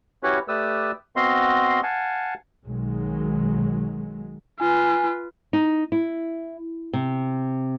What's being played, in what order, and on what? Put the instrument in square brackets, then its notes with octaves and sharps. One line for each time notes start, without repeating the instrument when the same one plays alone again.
[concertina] C#4 E4 F#4 G4 B4 C#5
A3 G4 B4 D5 D#6 E6
B3 C4 F#4 D#5 F5 C6
F5 F#5 G#5 A5
[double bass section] B1 D#3 F#3 G#3
[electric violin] F4 B4 [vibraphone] G#5
[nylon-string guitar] D#4
E4
C3